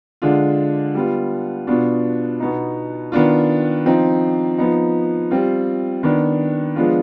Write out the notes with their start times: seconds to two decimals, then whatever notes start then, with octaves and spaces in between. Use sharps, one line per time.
0.22 D3 G#3 D4 F4
0.95 G3 B3 F4
1.67 B2 B3 D4 F4
2.40 B2 B3 D#4
3.12 D#3 B3 D4 F4
3.85 F3 C4 D#4
4.58 F3 B3 D#4
5.31 G3 C4 F4
6.03 D#3 B3 D4
6.76 F3 G#3 B3 D4 F4